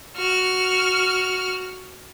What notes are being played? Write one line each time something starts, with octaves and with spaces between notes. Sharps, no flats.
F#4 F6